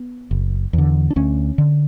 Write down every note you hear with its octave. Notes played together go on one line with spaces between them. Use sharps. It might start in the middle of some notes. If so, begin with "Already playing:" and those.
Already playing: B3
F#1
E2 D3
D4
D2 C#4
D3